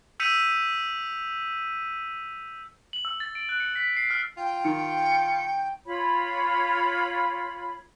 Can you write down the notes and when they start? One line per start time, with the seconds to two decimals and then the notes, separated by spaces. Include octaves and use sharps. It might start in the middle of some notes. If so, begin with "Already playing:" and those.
0.20 E6 G6 B6 C#7 D#7 F7
2.93 F#7
3.05 E6
3.20 A6
3.35 D7
3.49 F#6
3.60 C#7
3.76 B6
3.97 C7
4.10 F6
4.37 F4 G5
4.65 D#3 C#7
5.84 F4 C#5 B5